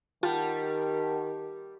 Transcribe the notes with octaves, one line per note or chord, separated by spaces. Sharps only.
D#3 G3 F4 F#5 G5 A5